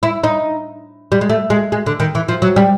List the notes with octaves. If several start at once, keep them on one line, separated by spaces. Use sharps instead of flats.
E4
D#4
G3
G#3
A3
G#3
G#3
D3
D#3
E3
F3
F#3
G3